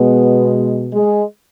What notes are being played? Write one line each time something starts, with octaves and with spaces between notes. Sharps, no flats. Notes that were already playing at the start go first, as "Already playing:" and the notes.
Already playing: B2 G#3 B3
G#3